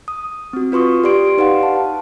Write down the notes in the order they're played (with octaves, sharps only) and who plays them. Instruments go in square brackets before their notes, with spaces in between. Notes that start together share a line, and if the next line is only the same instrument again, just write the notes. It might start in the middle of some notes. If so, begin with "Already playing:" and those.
[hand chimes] D#6
C4 F#4
F4 B4 C6 C#6 D#6
G4 D5 C6 D7
D#4 B4 D5 F5 F#5
A5